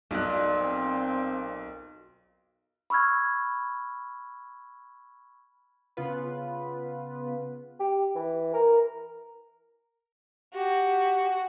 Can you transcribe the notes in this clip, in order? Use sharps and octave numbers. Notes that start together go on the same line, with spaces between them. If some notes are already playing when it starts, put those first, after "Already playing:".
B1 A#2 D4 D5 D#5 F#6
C4
B5 C#6 E6 F6 G#6
C#3 B3 F4 B4
G4
E3
A#4
F#4 G4